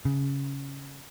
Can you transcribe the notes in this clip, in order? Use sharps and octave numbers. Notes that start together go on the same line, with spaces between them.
C#3